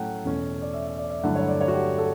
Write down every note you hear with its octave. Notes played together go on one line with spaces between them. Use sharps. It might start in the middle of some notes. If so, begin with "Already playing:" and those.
Already playing: A2 F#3 A3 C#4 F#5 G5
E2 B2 A3 C#4
D5
E5
E5
D5
E5
G2 D3 F#3 A3 E4 F#5
C#5
D5
C#5
F#4
G4
A4